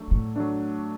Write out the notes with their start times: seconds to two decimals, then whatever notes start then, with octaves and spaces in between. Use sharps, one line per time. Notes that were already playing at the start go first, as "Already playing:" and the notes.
Already playing: F#3 A3 D4
0.11 A2
0.36 F#3 A3 D4